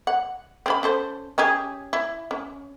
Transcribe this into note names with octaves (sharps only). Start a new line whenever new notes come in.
F#5
C4 C#4 B5
C#4 A4 C5
C#4 G4 G#4
E4
C#4